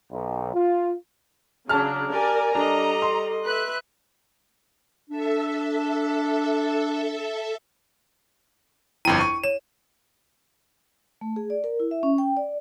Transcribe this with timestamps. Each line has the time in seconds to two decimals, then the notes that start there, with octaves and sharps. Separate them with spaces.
0.11 B1
0.54 F4
1.69 C#3 F#3 D4 A5 A#5 F6
2.11 G4 A#4 D5 G#5
2.55 G3 D4 A4 D#5 A#5
3.02 C6
3.45 B4 E5 F#6
5.10 D4 A4 E5
9.05 G1 F2 E4 G5 D#7
9.21 C#6
9.44 C#5 E7
11.21 A3
11.36 G#4
11.50 D5
11.64 A#4
11.80 E4
11.91 E5
12.03 C#4
12.18 G5
12.37 D5